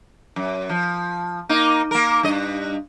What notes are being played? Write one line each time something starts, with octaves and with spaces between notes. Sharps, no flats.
F#2
F3
A#3 D#4
A#3 A#4
G2 D#5